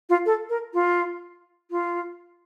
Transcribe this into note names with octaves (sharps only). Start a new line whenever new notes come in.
F4
A4
A#4
F4
F4